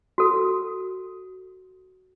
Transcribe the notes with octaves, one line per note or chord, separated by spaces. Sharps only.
F#4 A4